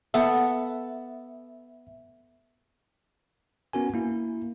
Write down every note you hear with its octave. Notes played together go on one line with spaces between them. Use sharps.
B3 A4 E5 F#5
B3 C#4 F#4 A#4 G#5
A#3 E4